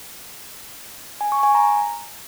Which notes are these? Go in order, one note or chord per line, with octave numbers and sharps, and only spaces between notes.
G#5
C#6
G#5
A#5